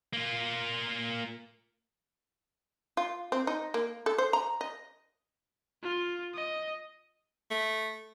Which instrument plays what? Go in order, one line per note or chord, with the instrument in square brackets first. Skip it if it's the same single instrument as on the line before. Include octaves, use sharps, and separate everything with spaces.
[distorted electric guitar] A#3 F4
[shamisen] F4
C4
D#4
A#3
A4
C5
A#5
D#5
[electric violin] F4
D#5
[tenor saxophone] A3